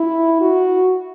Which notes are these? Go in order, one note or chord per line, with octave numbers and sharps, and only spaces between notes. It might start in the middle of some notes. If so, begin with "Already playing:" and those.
Already playing: E4
F#4